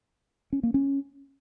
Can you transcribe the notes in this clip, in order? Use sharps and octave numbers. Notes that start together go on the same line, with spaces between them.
C#4
A#3
C#4